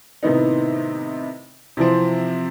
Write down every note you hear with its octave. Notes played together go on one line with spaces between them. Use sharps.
A2 C3 D#3 B3 D#4
C3 E3 F3 C4